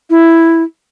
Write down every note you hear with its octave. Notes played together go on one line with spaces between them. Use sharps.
E4